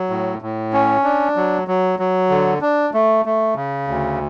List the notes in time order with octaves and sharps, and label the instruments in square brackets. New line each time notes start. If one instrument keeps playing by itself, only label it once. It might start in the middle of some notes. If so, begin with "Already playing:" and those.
Already playing: [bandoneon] F#3
A2
A2
C#4
D4
F#3
F#3
F#3
D3
D4
A3
A3
C#3
D2